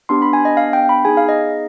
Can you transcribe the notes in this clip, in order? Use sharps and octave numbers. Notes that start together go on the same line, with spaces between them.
B3 D4 G4 C6
B5
G#5
D#5
F5
G5
B5
B3 D#4 G#4 G#5
F5
D#5